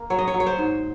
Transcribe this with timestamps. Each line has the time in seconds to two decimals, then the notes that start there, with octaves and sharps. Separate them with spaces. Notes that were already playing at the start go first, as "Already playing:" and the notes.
Already playing: A#3
0.10 F#3 C#5
0.19 D#5
0.28 C#5
0.34 F#3
0.40 C#5
0.47 C5
0.58 G#2